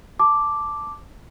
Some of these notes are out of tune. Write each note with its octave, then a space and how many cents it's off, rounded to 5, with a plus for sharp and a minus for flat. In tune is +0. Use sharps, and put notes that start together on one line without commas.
A5 +0 D6 +0